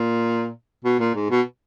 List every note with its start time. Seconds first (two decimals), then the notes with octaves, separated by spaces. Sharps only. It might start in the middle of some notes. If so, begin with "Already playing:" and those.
Already playing: A#2
0.85 B2
1.00 A#2
1.15 G#2
1.30 B2